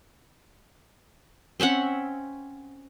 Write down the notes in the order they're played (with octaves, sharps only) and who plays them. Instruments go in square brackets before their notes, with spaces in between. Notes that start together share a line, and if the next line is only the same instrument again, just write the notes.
[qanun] C4 C#4 E5 F#5